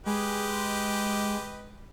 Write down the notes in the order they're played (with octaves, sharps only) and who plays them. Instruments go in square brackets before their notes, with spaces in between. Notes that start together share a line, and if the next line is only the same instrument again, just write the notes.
[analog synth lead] G#3 [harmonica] G4 B4 D#5